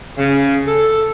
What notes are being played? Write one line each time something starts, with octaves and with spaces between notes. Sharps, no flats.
C#3
A4